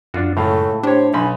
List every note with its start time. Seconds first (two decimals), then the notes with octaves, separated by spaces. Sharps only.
0.14 F#2 D4 F4 F#4
0.37 C#2 A2 A3 F5
0.83 D4 G4 C5 C#5
1.14 B1 G#5 B5 C6